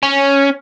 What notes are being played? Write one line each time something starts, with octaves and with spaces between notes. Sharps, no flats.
C#4